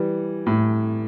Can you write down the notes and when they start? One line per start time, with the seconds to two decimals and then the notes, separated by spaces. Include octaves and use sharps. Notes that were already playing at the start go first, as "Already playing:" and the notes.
Already playing: E3 G3
0.46 A2